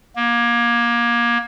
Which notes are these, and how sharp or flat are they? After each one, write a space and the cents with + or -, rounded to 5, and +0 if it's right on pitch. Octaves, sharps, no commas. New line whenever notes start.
A#3 +25